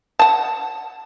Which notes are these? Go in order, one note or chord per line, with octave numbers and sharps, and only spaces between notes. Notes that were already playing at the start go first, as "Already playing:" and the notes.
F#5 A5